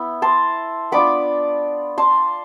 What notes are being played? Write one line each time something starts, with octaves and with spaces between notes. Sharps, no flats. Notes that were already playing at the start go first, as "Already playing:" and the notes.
Already playing: B3 E4 B5
A5 C6
B3 D4 F4 B5 D6
A5 C6